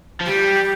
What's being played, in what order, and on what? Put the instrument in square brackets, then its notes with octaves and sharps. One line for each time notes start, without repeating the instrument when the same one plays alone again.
[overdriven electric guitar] F3
[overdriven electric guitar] G3 [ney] G4